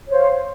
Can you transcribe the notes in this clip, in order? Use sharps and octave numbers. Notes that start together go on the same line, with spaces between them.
C5 C#5 F5